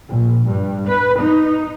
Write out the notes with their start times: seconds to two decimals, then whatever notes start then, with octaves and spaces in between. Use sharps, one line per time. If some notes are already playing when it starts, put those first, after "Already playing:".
0.10 A#1
0.48 G2
0.89 B4
1.20 D#4